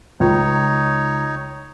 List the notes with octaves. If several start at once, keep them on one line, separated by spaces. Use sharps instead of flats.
C#2 D#4 C#5